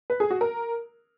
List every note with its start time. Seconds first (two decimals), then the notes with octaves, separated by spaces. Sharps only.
0.10 B4
0.20 G#4
0.30 F#4
0.41 A#4